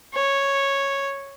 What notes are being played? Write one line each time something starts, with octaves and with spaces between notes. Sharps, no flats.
C#5